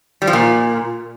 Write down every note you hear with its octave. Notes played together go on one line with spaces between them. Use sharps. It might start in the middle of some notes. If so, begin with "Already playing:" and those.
G3
F3
A#2